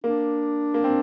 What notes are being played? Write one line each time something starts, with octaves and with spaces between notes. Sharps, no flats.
A#3 D4
A#3
C4